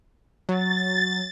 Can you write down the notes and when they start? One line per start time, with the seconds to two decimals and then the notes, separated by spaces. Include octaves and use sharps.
0.49 F#3 A6